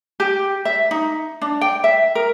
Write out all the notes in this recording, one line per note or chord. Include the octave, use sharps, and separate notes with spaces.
G4
E5
D#4
D4
G5
E5
A#4